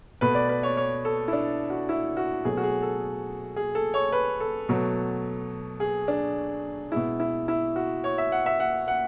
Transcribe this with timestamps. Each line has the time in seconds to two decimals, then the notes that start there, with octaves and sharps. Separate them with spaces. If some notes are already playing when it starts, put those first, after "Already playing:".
0.21 B2 A3 B4
0.35 D5
0.49 B4
0.63 C#5
0.77 C#5
1.05 A4
1.28 E4
1.33 D4
1.70 F#4
1.89 E4
2.17 F#4
2.45 B2 F#3 A3 G#4
2.57 F#4
2.63 G#4
2.82 A4
3.56 G#4
3.75 A4
3.94 C#5
4.12 B4
4.40 A4
4.69 B2 F#3 A3
5.80 G#4
6.08 D4
6.92 B2 G#3 E4
7.20 E4
7.48 E4
7.76 F#4
8.04 C#5
8.18 E5
8.32 F#5
8.46 E5
8.60 F#5
8.88 F#5